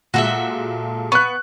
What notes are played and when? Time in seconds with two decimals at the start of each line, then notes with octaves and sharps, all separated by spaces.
0.14 A#2 G#3 F#4 A4 E5
1.12 B3 C#6 F#6